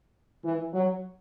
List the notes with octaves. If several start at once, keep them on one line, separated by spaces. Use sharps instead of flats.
E3
F#3